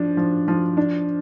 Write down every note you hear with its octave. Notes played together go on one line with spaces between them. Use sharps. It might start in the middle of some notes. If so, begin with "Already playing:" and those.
Already playing: F3 D4
F3
F3
D4